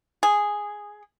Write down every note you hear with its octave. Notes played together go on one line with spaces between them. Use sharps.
G#4